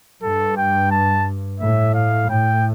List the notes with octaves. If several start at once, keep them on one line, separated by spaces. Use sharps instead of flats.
G2 A4
G5
A5
A2 E5
F5
A2 G5